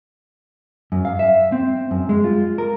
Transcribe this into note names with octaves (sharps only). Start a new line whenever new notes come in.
F#2
F5
E5
C4
F#2
G#3
F4
A#4